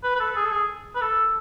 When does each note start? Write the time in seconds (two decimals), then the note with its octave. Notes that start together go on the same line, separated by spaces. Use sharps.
0.03 B4
0.15 B4
0.20 A4
0.36 G#4
0.45 A4
0.52 G#4
0.95 B4
1.01 A4